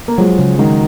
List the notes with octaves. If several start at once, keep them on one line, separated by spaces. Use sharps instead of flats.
A#3
F3 F#3 G#3
C#3
D#3 F#3 G#3